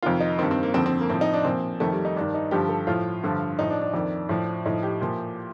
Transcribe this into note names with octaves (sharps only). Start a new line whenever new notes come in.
F2 C3 D#3 F4
D#4
G2 D#3 C4
C4
A#3
F2 D3 F3 C4
C4
A#3
A2 F3 C4
D#4
D4
A#2 F3 C4
F2 D#3 A3
G3
D#4
G2 D#3 D4
D#4
G2 D3 F3 G4
A4
A2 F3 F4
G2 D3 F3
A2 F3 D#4
D4
D4
F2 D#3
A2 F3
A2 F3 D#4
G4
A#2 F3